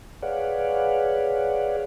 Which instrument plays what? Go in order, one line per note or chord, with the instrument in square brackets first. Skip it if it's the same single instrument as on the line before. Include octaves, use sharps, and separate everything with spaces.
[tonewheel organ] G#4 B4 C#5 D5 F5 F#5